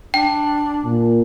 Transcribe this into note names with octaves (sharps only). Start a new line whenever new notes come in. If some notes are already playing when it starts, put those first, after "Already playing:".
D4 G5
A#2